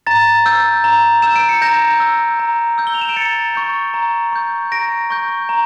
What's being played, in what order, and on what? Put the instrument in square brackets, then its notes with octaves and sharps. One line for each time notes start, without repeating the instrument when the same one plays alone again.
[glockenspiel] A#5 A6
E6 G6
A#5
E6 G6 E7
D7
C#7
A#5 G6 A#6
E6 G6
A#5
E6 G6
G7
F7
E7
D7
A#5 A6 C#7
C#6 G6
A#5
C#6 G6
A#5 A#6 D7
C#6 G6
A#5